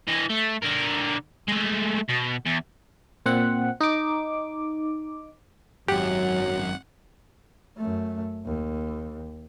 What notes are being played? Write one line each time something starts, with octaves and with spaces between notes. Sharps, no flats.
E3 D#5
A3
D3 A#4
G#3 A3
B2
E2
A#2 C4 F#5
D#4 D6
G#1 F#2 F#3 G4 F#5
F#2 A3
D#2